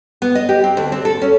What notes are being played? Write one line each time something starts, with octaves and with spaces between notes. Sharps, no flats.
B3
D#5
G4
C4
D2
C4
A4
C#4